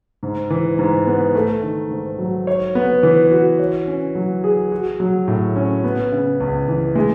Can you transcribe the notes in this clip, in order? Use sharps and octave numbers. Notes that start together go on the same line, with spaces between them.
G#2
E3
G#2
B3
A3
D#3
G#2
F#3
C#5
B3
E3
F#4
C#5
C#4
F#3
G#4
F#4
F#3
A2
C#4
B3
C#3
C#2
E3
G#3